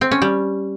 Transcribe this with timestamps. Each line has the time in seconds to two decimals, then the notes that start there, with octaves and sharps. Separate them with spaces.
0.01 C4
0.11 C#4
0.22 G3